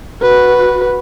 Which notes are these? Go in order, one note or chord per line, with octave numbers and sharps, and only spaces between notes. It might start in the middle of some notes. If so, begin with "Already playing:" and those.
F#4 B4